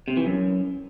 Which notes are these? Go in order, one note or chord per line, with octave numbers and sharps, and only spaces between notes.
C3
E3
F#2